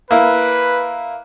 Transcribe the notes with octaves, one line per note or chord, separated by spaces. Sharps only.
A#3 E4 B4